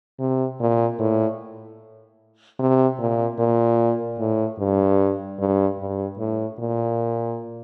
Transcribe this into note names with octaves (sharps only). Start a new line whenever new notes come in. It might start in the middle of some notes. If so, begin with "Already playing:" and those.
C3
A#2
A2
C3
A#2
A#2
A2
G2
G2
G2
A2
A#2